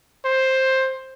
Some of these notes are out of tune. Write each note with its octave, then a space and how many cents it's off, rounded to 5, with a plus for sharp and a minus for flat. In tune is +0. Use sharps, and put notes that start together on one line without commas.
C5 +10